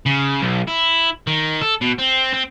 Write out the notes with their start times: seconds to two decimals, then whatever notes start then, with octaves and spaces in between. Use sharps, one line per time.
0.06 C#3
0.41 B1
0.67 E4
1.27 D#3
1.61 A4
1.81 B2
1.99 C4
2.34 C4